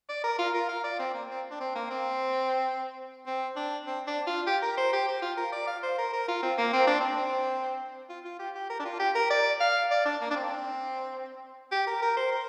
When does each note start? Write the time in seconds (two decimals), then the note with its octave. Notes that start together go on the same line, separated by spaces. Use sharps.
0.09 D5
0.24 A#4
0.39 F4
0.54 A#4
0.69 F5
0.84 D5
0.99 C4
1.14 A#3
1.30 C4
1.51 D4
1.61 C4
1.75 A#3
1.90 C4
3.26 C4
3.56 D4
3.87 C4
4.07 D4
4.27 F4
4.47 G4
4.62 A#4
4.77 C5
4.93 G4
5.08 G4
5.22 F4
5.37 A#4
5.52 D5
5.67 F5
5.83 C5
5.98 A#4
6.13 A#4
6.28 F4
6.43 C4
6.58 A#3
6.73 C4
6.87 D4
7.01 C4
8.09 F4
8.25 F4
8.39 G4
8.55 G4
8.70 A#4
8.80 D4
8.85 F4
8.99 G4
9.15 A#4
9.30 D5
9.60 F5
9.91 D5
10.06 D4
10.21 A#3
10.30 D4
10.36 C4
11.72 G4
11.87 A#4
12.02 A#4
12.17 C5
12.32 A#4